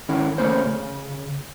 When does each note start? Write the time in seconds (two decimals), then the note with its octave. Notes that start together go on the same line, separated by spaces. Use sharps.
0.09 D#3 C#4 E4
0.38 C#3 E3 A3 A#3 C#4 C5
0.65 C#3